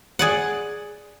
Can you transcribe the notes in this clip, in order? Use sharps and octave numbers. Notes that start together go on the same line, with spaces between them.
G#4 D5 F#5